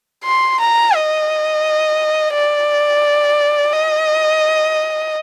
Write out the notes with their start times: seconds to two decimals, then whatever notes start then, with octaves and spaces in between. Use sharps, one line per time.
0.24 C6
0.59 A#5
0.94 D#5
2.33 D5
3.72 D#5